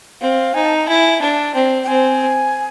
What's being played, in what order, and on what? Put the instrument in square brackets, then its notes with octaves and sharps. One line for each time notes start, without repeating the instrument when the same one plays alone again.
[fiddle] C4 [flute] F5
[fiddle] D#4 [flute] G#5
[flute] A5
A#5
[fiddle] E4 [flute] G#5
[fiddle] D4 [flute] A5
[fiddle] C4 [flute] G5
[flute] G5
[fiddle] C4 [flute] G#5